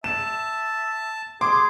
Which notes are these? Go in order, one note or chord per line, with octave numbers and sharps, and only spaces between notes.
E5 A5 E7
G#4 C6 D6